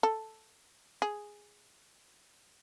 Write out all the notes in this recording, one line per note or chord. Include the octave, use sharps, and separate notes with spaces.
A4
G#4